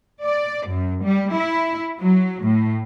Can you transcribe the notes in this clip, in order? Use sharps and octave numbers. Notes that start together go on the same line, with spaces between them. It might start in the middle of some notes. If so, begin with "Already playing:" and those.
D5
F#2
G3
E4
F#3
A2